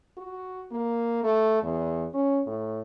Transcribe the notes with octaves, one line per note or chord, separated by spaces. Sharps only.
F#4
A#3
A3
E2
C#4
A2